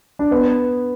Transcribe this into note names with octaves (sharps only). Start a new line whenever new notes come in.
D4
B3